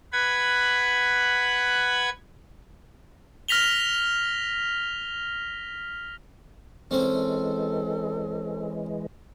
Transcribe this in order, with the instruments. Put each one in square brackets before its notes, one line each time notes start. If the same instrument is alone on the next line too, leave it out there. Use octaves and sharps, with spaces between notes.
[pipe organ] B4 F#5 B5 G#6
[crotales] F6 A#6 B6 F7 G7
[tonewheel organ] E3 G#3 [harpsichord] C4 C#4 C5 [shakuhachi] A4